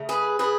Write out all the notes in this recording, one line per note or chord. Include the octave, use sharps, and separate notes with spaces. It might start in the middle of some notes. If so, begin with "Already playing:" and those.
Already playing: C#3 A3
G#4 B4
C#3 G#4 B4